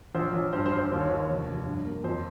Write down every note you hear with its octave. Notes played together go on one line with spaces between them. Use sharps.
A#1 C5
A#1 C#5
G2 C5
C5
G2
C5
D#2 C5
C#5
D#2 C5
C#5
F1
F1
G2
A#3
F2 C5